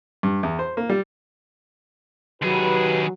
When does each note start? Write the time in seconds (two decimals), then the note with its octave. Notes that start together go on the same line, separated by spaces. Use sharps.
0.23 G2
0.43 E2
0.59 C5
0.77 A#3
0.89 G3
2.42 D#2 F#3 G4 G#4 B4